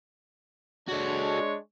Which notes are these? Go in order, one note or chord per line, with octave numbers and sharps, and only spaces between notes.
G#3 D4 F#4 A4 C#5